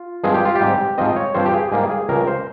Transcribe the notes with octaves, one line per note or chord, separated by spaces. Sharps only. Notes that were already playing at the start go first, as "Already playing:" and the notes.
Already playing: F4
G2 F3 G#3 C4 G#4
G4
F4
G4
G#2 G3 C4
G#2 F3 C4 D#5
C#5
G2 F3 C4 C5
G4
G#4
G#2 G3 A#3 G#4
G#4
C#2 C#3 G3 A#4
C5